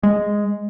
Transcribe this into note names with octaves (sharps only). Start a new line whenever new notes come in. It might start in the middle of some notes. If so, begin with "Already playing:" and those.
G#3